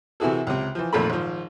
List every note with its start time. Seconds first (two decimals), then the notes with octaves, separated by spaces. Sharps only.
0.20 C3 E3 E4 F#4 G#4 A4
0.47 C#2 C3
0.75 E3 F3
0.93 G#1 F2 A#2 A3 A4 B5
1.10 G#1 F3